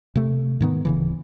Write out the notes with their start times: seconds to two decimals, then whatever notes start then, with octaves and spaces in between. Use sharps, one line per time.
0.16 C3 A3
0.60 G#2 D#3 B3
0.85 D1 C#3 E3